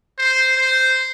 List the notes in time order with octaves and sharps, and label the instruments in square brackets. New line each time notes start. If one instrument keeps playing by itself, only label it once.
[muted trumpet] C5
C5